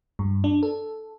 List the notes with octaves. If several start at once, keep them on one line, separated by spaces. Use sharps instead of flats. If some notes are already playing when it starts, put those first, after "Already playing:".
G2
D4
A4